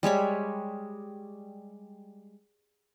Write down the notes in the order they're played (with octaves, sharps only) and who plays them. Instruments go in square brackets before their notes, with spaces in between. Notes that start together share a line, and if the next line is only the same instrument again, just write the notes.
[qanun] G3 G#3 C#5 B5